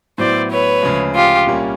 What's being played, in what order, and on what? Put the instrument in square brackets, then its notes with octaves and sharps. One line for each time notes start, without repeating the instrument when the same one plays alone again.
[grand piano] A2 F#3 B3 E4 [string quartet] C5 D5
[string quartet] B4 C#5
[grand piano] D2 C#3 F3 G#3
[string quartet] F4 G4
[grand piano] C2 A#2 G3 A#3 C#4